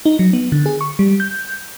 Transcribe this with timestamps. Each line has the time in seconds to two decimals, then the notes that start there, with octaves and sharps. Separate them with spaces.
0.06 D#4
0.19 F#3
0.33 B3
0.52 D3
0.66 G#4
0.81 C#6
0.99 G3
1.20 G6